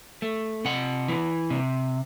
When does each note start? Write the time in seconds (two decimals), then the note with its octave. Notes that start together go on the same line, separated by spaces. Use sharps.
0.22 A3
0.65 C3 F#5
1.08 E3
1.50 C3